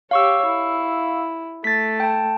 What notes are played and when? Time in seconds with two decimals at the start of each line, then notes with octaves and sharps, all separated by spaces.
0.11 G4 C#5 F5 C#6 E6
0.46 E4
1.64 A3 A6 B6
2.00 G5 A5